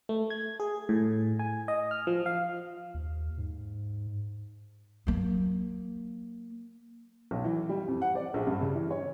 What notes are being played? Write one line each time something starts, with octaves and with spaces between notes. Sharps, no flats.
A3
G#6
G#4
A2
G#5
D#5
F6
F3
F5
D#2
G#2
F#3 A#3
B1
E3
G3
F2
F#5
D5
A#1
G2
C#3
E3
C#5